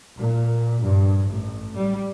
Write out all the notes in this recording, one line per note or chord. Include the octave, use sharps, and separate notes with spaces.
A#2
G2
A1
G3